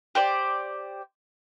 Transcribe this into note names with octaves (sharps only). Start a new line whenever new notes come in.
G4 C5 D5